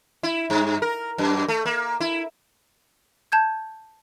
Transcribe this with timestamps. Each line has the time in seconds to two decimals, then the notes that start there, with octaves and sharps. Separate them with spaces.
0.23 E4
0.50 G2
0.82 A#4
1.18 F#2
1.48 A3
1.66 A#3
2.00 E4
3.32 A5 G6 G#6